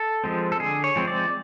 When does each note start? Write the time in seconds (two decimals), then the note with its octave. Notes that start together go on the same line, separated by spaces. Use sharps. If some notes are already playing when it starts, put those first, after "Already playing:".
Already playing: A4
0.24 F3 G#3 C4
0.52 A4
0.60 D3 G#4
0.84 C#5
0.96 F3 G#3 C4
1.08 D5